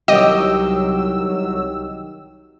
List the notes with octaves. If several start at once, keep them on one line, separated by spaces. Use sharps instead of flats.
C2 D#3 F#3 G4 D#5 E6